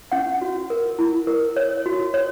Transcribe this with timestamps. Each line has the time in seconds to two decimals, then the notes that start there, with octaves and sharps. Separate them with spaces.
0.12 C#4 F#5
0.42 F#4
0.70 A#4
0.99 E4
1.27 A#4
1.56 C#5
1.86 F#4
2.14 C#5